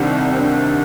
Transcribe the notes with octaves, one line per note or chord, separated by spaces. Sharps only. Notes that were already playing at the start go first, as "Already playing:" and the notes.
Already playing: C2 C3 D#3 D4
C4
D4